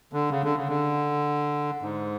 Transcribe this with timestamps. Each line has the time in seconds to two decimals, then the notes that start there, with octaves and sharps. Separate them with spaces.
0.13 D3
0.31 C#3
0.44 D3
0.56 C#3
0.69 D3
1.82 G#2